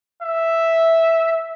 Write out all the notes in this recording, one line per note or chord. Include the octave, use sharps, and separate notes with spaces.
E5